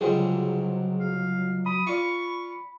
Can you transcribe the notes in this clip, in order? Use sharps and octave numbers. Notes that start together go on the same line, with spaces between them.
C#2 D3 F#3 G3 G#4 C5
F5
B5 D#6
F4 D5 C#6